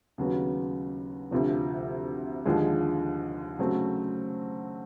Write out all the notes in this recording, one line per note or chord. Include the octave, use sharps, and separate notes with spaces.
D#2 C#3 F#3 B3
D2 C3 F3
D#2 D3 F3 G#3
C#3 F#3 A3 C4